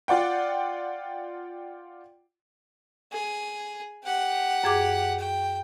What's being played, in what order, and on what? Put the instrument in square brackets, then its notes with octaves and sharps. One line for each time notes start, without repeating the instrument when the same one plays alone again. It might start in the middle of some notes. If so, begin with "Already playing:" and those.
[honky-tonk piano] F4 D5 F#5 G5
[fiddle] G#4
G4 F#5
[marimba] F#2 G#4 D6
[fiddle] G5